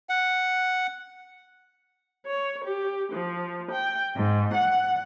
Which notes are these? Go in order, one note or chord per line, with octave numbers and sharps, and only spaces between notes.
F#5
C#5
G4
F3
G5
G#2
F#5